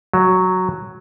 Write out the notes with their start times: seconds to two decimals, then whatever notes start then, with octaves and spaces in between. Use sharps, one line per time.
0.13 F#3